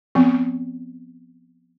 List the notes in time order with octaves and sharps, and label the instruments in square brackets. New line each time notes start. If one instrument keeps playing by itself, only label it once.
[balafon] F3 B3 C4